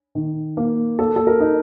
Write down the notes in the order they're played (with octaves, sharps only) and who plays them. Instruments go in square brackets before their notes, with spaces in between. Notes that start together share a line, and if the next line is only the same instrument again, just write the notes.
[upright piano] D#3
A#3
[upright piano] A#3 [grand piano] A4
[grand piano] A4
A#4
[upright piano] D#4